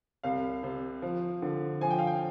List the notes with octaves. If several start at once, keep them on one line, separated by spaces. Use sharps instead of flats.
C2 F5
C3
F3
D3
F3 G#5
G5
F5
G5